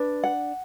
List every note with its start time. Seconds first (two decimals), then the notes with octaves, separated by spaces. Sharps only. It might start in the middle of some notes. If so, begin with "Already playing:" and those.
Already playing: D4 B4
0.23 F#5